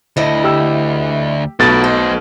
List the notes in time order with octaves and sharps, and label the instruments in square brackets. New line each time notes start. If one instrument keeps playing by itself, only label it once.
[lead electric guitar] D2 [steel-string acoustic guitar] E4 D#5
[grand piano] G4 E6
[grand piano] B1 A3 [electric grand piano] B2 A6 [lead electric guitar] F4 B5
[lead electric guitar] A4 D#5 [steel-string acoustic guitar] C5